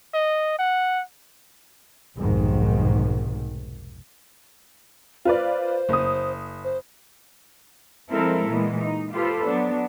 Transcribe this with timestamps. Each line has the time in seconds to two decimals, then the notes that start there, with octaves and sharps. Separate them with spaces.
0.14 D#5
0.59 F#5
2.17 F1 B1 G#2 D#3
5.25 F4 B4 C5 D5
5.89 F#1 D#6
6.64 C5
8.11 F3 G#3 C4 E4 A4 A#4
8.48 A#2 E3 G#3 B3
8.79 D#4
9.12 F4 G4 A4 B4 C5
9.46 F#3 B3 D4